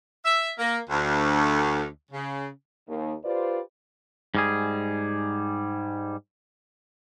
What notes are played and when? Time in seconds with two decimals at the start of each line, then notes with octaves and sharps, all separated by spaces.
0.25 E5
0.58 A#3
0.90 D2
2.11 C#3
2.88 D#2
3.25 F4 G4 B4 C5 D5
4.35 G#2 G3 G#4